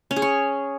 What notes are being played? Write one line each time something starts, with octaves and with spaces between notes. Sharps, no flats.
C#4
G#4
C#5